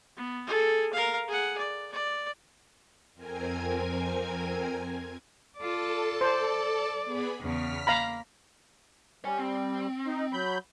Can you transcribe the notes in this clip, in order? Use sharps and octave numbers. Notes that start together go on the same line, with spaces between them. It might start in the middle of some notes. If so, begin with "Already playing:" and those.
B3
G#4 A4
A#4 F5
G#4 F#5
D5
D5
F2 C4 A#4 G#5 G#6
F4 A4 D5 A5
C5 D5
B3 G#4 B5
E2 C#3 F6 B6
A#3 F5 A#5 B5
G3 C#5 G#5
C4
D#4
F#3 B5 G6